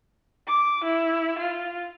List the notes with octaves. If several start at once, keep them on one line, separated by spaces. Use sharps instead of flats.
D6
E4
F4